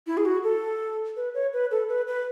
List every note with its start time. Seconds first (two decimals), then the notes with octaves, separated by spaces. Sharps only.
0.07 E4
0.17 G#4
0.25 F#4
0.43 A4
1.16 B4
1.34 C#5
1.53 B4
1.71 A4
1.89 B4
2.07 B4